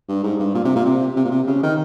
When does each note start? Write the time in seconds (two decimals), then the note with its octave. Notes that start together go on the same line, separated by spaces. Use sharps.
0.08 G2
0.23 G#2
0.40 G2
0.55 A#2
0.64 C3
0.76 A#2
0.86 C3
1.16 C3
1.25 A#2
1.31 C3
1.47 C#3
1.63 D#3